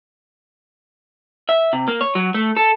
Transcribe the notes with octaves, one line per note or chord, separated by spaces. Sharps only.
E5
C3
A#3
C#5
F#3
A3
A4